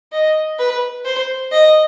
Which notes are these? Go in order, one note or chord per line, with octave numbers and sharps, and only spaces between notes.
D#5
B4
C5
D#5